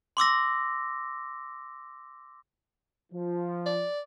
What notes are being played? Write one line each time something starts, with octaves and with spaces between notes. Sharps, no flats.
C6 D6 E6 A#6
F3
D5